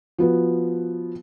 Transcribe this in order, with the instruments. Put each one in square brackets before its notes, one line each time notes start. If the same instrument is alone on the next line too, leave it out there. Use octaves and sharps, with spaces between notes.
[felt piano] F3 B3 F#4